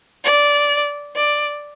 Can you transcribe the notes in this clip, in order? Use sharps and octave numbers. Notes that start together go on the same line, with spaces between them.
D5
D5